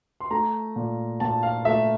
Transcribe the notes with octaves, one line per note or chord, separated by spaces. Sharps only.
C6
A3 A#5
A#2
A#2 A5
F5
A3 E5